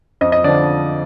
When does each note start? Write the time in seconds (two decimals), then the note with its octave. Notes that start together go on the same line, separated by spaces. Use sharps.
0.21 F2 D#5
0.32 D#5
0.44 D3 D5
0.48 F3